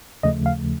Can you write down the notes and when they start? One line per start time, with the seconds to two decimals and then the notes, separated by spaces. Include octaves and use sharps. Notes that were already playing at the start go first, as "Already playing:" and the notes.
0.23 D#2 C#3 F3 A3 D#5
0.46 F5